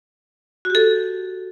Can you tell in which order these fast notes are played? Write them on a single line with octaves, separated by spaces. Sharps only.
F#4 G4 A4